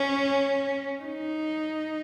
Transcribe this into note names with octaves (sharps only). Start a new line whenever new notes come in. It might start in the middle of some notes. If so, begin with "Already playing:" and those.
Already playing: C#4
D#4